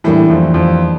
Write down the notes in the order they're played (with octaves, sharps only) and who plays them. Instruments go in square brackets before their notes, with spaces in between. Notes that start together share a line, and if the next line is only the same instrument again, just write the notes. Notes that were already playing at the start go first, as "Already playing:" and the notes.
[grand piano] A2 [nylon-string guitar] E3 G3 A#3 D4
[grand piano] F2
F2